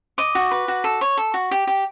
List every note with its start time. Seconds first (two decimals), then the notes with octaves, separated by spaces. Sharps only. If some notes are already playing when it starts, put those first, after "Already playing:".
0.18 D#5 D6
0.35 F#4
0.51 B4
0.68 F#4
0.84 A4
1.01 C#5
1.17 A4
1.34 F#4
1.51 G4
1.67 G4